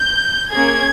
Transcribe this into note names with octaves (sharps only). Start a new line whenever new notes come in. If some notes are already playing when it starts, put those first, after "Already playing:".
Already playing: G6
A#3 C#4 G#4 G#6